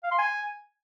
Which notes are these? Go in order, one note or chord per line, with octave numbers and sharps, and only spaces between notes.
F5
C6
G#5